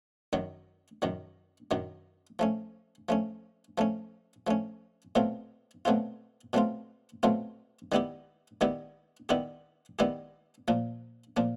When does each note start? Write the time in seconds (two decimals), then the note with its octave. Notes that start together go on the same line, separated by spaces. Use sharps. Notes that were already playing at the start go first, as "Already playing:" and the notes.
0.33 F#2 D#3 F#3
1.02 F#2 D#3 F#3
1.71 F#2 D#3 F#3
2.39 F3 A3 C#4
3.09 F3 A3 C#4
3.78 F3 A3 C#4
4.47 F3 A3 C#4
5.15 B2 F#3 A3 C4 F4
5.85 B2 F#3 A3 C4 F4
6.53 B2 F#3 A3 C4 F4
7.23 B2 F#3 A3 C4 F4
7.92 D#3 G3 B3 E4 G4
8.61 D#3 G3 B3 E4 G4
9.29 D#3 G3 B3 E4 G4
9.99 D#3 G3 B3 E4 G4
10.68 A#2 F3 A#3
11.37 A#2 F3 A#3